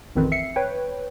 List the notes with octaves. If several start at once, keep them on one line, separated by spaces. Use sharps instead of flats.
A1 F2 D#3 C4 B4
E5 C7 C#7
B4 C#5 G5